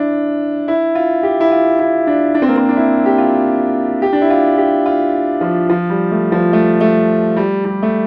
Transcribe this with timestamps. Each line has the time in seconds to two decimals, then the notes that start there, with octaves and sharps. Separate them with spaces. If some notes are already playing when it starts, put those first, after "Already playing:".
Already playing: D4 E4
0.68 E4
0.95 F4
1.23 G4
1.40 E4
1.51 F4
1.79 E4
2.07 D4
2.35 D4
2.42 C4
2.49 A#3
2.56 C4
2.69 D4
2.76 E4
3.06 G4
3.18 F4
4.02 G4
4.13 D4
4.21 E4
4.30 F4
4.58 G4
4.86 F4
5.41 F3
5.69 F3
5.90 G3
6.12 A3
6.32 F3
6.53 A3
6.81 A3
7.37 G3
7.64 G3
7.83 A3